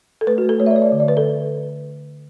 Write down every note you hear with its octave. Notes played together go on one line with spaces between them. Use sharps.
A4
A3 B4
F#4
A3
A4
A3 C#5
E5
D5
A3 C#5
D5
D3
D5
D3 B4
A4